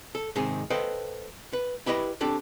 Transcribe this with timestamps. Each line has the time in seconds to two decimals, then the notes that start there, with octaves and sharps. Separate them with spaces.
0.15 A4
0.35 G#2 C3 D#3 C4 G#4
0.70 A4 B4 C5 D#5 F5 G5
1.53 B4
1.86 E4 G4 B4 D#5 B5
2.21 C4 D4 G4 A4